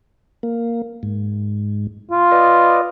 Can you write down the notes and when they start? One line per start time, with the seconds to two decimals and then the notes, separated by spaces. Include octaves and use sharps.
0.43 A#3
1.03 G#2
2.11 F4
2.32 B4 D5 D#5